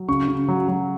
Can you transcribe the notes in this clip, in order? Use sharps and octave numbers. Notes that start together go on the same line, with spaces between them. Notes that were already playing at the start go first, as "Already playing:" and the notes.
Already playing: F#3
C#3 C#6
C#3
F#3
F#3